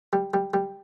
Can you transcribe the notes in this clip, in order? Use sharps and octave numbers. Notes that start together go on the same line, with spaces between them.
G3
G3
G3